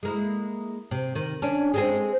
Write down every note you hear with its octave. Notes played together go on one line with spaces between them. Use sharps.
G#3 A#3 E4
C3
D#3
C#4 D4
G#3 C4 G#4